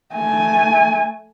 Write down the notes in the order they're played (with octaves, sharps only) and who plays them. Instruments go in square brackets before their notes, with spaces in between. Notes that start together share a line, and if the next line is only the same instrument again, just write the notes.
[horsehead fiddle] A3 G#5